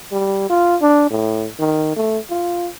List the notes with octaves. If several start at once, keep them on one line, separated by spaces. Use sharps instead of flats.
G3
F4
D4
A2
D#3
A3
F4